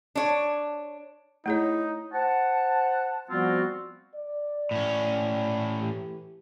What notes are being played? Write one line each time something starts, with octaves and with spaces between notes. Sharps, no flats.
D4 C#5
A3 D#4 E4 G#4 C#5
C5 F#5 A5
F3 G3 B3 C4 F4 F#4
D5
A2 C#4
E3 A3 G4